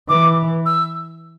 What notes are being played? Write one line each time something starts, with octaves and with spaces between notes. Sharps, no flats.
E3 D6
E6